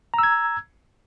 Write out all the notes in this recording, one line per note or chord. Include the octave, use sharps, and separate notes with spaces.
A#5 E6 G#6